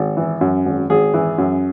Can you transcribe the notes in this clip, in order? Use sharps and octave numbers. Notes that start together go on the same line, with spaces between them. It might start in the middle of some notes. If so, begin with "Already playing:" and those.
Already playing: G#1
E3
F#2
G#1
G#1 G#4
E3
F#2